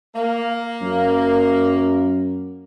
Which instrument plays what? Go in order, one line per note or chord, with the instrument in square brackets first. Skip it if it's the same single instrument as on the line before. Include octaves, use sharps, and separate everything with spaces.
[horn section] A#3
[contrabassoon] F#2